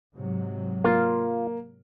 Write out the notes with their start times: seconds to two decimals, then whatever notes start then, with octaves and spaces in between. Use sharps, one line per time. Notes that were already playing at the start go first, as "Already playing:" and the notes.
0.15 G#2 C3 F#3
0.84 A#3 F4